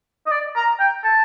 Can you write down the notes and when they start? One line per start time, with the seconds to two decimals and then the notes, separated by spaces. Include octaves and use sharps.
0.27 D#5
0.31 D5
0.56 A#5
0.80 G5
1.04 A5